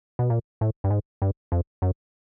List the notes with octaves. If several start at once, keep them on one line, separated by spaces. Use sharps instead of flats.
B2
A#2
A2
G2
G#2
G2
F2
F#2